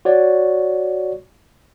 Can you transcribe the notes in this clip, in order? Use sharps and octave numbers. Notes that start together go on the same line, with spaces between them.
F#4 C#5 D5